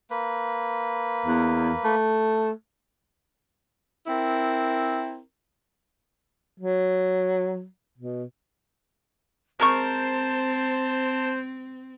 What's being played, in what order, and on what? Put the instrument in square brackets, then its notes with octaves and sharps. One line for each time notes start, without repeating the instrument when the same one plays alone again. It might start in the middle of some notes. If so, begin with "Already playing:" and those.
[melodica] A#3 B4
[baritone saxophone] E2
A3
[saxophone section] C4 E4 A#4
[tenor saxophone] F#3
B2
[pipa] G#3 A#4 C#6 [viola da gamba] C4 [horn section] C5 [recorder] A5